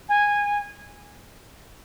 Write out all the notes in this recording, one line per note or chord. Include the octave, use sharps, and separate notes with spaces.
G#5